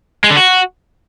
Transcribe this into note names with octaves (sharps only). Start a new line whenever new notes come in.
G#3
D3
F#4